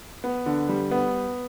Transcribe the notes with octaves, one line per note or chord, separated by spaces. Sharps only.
B3
D3
G3
B3